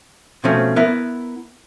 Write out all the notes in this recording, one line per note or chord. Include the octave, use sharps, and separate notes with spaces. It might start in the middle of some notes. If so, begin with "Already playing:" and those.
B2 F3 A3 C4 C#4
B3 E4 A#4 E5